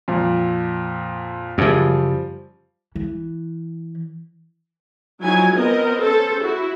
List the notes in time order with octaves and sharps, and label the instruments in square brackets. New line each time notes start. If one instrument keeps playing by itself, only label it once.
[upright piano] F2 A#2
[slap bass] F#2 C#3 [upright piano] F3 G3
[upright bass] E3
[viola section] F3 F#3 D#4 E4 G#5
B3 C4 A#4 D#5
C#4 A4 C5
E4 F#4